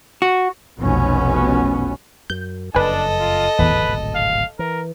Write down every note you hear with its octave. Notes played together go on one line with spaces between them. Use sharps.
F#4
F1 B1 B2 B3 C#4
F#2 G6
F#1 F2 D4 A4 B4 D#5 G#5
F4
D1 G#1 E2 B2 B4
F5
E3 A#4